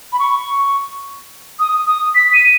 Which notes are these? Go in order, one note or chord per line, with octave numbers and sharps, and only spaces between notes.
B5
C#6
D#6
D#6
B6
D#7